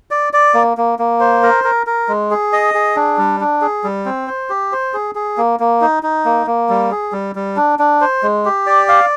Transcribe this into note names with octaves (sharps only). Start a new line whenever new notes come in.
D5
D5
A#3
A#3
A#3
C5
A#4
A#4
A#4
G#3
G#4
D#5
G#4
D4
G3
D4
G#4
G3
C4
C5
G4
C5
G#4
G#4
A#3
A#3
D#4
D#4
A#3
A#3
G3
G#4
G3
G3
D4
D4
C5
G#3
G4
D5
F5